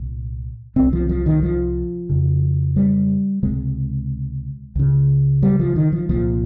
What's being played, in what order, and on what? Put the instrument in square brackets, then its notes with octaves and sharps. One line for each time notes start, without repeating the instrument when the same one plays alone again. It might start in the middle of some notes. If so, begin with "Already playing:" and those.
Already playing: [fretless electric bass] C2 A#2
C2 C3 C4
F3
F3
D#3
F3
F2 C#3
G3
C#2 C3 G#3
C#2 C#3
G3
F3
D#3
F3
C2 A#2 F3